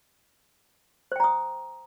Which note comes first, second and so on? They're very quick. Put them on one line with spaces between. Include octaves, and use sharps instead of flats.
C5 G5 A#5 D#6